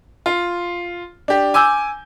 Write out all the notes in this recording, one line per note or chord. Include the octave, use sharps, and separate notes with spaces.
F4
D4 G4
G#5 D6 E6 G6